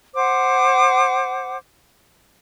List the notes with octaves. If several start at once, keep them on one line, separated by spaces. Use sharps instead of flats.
C5 F#5 D6